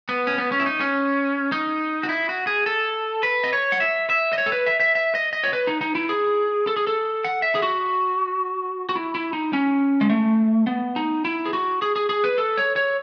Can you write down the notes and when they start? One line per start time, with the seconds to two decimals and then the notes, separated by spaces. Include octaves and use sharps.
0.09 B3
0.27 C#4
0.38 B3
0.52 C#4
0.60 E4
0.66 D#4
0.80 C#4
1.52 D#4
2.03 F#4
2.09 E4
2.29 F#4
2.47 G#4
2.66 A4
3.23 B4
3.44 D#5
3.53 C#5
3.72 F#5
3.80 E5
4.10 E5
4.33 D#5
4.38 C#5
4.46 A4
4.52 B4
4.66 E5
4.80 E5
4.95 E5
5.15 D#5
5.33 D#5
5.44 C#5
5.53 B4
5.67 D#4
5.81 D#4
5.95 E4
6.09 G#4
6.67 A4
6.76 G#4
6.87 A4
7.24 F#5
7.42 E5
7.55 G#4
7.62 F#4
8.89 F#4
8.95 E4
9.15 E4
9.33 D#4
9.53 C#4
10.01 G#3
10.10 A3
10.67 B3
10.96 D#4
11.25 E4
11.46 G#4
11.53 F#4
11.82 G#4
11.96 G#4
12.09 G#4
12.24 B4
12.38 A4
12.57 C#5
12.76 C#5